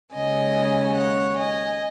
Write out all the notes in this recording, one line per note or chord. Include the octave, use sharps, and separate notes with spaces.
D#2 C#3 G#3 D#5 G#5
C#5 F#5
D#5 G#5